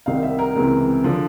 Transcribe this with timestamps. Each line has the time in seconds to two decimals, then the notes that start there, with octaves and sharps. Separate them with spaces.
0.06 C2 C3 D#3 F5
0.23 E5
0.39 A#4
0.56 C#2 C3 E3
1.04 D3 F3